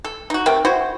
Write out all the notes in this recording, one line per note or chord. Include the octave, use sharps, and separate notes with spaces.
A4
D#4 F#4
C3 A3 A#4 G5
E4 F#4 C5